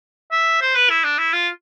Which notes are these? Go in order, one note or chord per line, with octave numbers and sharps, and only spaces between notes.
E5
C5
B4
E4
D4
E4
F4